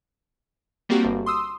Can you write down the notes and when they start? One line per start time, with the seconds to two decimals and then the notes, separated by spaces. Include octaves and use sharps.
0.89 G3 A#3 C4 D4 F#4 G4
1.04 G1
1.26 C6 D#6 E6